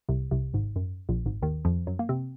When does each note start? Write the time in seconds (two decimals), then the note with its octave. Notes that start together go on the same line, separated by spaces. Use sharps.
0.09 C2 C3
0.31 C2 C3
0.53 G#1 G#2
0.76 F#2
1.09 A#1 A#2
1.26 G#1 G#2
1.42 D#2 D#3
1.65 F2 F3
1.87 F#2 F#3
1.99 A#3
2.09 C3 C4